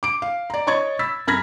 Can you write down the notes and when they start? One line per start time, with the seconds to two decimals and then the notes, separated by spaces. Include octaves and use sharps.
0.03 D6 D7
0.22 F5
0.50 D5 A#5
0.67 C#5 D#5 C#6 G#6 A6
0.99 B5 E6 A6 B6
1.27 F#2 B5 F6 G#6 A#6 B6